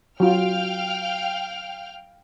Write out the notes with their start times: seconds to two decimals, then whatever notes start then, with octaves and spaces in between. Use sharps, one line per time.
0.20 F#3 F4 F5 G5 F6